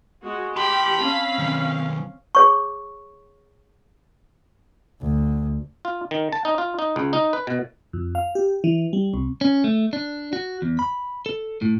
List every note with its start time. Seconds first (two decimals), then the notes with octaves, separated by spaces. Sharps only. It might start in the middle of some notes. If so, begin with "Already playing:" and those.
0.23 G#3 F#4
0.56 G4 A5 B5 C6
1.00 C4 C#4 F5
1.39 D#3 F#3
2.35 G#4 C#5 C#6
5.01 D2
5.85 F4
6.11 D#3
6.32 A5
6.45 D#4
6.58 F4
6.79 D#4
6.96 C#2
7.13 D#4
7.33 B4
7.47 B2
7.93 F2
8.15 F5
8.35 G4
8.64 E3
8.93 G3
9.14 C2
9.41 C#4
9.64 A3
9.93 D4
10.33 F#4
10.62 E2
10.79 B5
11.26 A4
11.62 A2